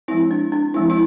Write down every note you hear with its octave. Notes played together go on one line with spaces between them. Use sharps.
F3 G#3 C4 E4
D4
D4
F3 G#3 C4 E4
E4